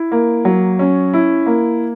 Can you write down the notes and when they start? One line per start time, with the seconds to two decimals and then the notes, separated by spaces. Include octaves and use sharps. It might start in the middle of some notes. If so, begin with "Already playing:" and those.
Already playing: E4
0.12 A#3
0.45 F#3
0.79 C#4
1.14 E4
1.46 A#3